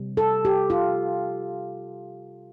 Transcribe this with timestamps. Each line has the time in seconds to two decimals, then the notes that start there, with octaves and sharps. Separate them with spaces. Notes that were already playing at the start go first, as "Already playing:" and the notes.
Already playing: C3 G3
0.17 A4
0.45 G4
0.70 F4